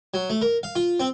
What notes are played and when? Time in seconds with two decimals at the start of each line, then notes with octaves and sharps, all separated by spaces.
0.14 F#3
0.30 A3
0.42 A#4
0.63 F5
0.76 F4
1.00 C4